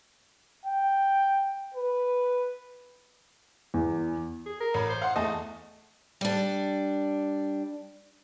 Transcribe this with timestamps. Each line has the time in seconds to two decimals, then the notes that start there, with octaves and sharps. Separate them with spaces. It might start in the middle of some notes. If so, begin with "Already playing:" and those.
0.66 G5
1.74 B4
3.74 E2
4.46 G#4
4.60 A#4
4.74 A1 B5
4.90 C5
5.02 F5 F#5 C6
5.16 E2 A3 D#5 A5
6.21 G3 D4